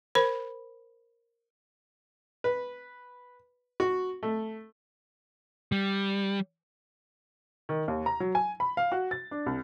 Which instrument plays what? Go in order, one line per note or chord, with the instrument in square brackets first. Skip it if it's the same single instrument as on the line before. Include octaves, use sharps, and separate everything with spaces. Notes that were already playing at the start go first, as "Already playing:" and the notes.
[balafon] A#4 C5 B5
[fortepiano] B4
F#4
A3
[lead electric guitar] G3
[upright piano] D#3
D#2
A#5
F#3
G#5
B5
F5
F#4
A6
D4
C2